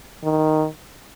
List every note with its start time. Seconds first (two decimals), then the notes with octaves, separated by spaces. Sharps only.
0.24 D#3